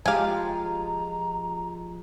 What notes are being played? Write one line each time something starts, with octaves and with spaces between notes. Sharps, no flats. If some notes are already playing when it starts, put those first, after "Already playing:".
F3 G#3 G4 F5 G#5 A#5